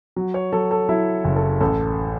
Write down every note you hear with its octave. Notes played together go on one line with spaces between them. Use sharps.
F#3
C#5
F#3 A4
A4
F#3 E4
F#1
A4
A1 A4